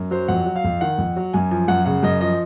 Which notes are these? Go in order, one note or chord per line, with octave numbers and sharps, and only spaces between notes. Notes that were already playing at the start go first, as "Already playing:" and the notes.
Already playing: F#2
F#3 C5
F2 F#5
F#3
F5
F2
D#3 F#5
F2
F#3
F#2 G#5
F3 G#5
F#2 F#5
C#3 F#5
F#2 D#5
F3 D#5